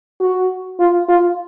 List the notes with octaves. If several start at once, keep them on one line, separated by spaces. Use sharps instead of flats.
F#4
F4
F4